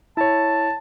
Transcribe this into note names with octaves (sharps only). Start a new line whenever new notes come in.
E4 C#5 A5